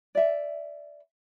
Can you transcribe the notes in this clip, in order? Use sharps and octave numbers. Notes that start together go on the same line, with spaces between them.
D5 E5